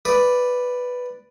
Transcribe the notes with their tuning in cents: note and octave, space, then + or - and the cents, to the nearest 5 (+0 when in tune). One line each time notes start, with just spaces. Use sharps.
B4 +0 D5 +0